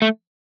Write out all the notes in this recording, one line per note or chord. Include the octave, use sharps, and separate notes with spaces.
A3